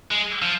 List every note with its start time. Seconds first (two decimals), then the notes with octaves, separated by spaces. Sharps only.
0.11 G#3
0.42 F3